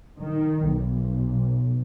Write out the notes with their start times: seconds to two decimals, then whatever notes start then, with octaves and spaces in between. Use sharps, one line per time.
0.20 D#3
0.67 B1